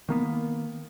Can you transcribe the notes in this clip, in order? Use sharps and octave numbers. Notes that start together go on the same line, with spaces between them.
D#3 A#3 B3